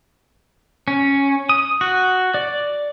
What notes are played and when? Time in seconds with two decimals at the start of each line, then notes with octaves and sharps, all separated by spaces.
0.88 C#4
1.49 D#6
1.81 F#4
2.34 D5